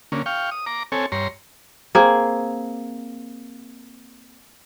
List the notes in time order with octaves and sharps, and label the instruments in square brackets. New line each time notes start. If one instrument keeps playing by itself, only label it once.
[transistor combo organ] D3 A#3 C#4
F5 G5 C#6
D#6
A#5 D6
C4 A4 C#5 G#5
G2 C#5 A#5 C6
[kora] A#3 C4 G#4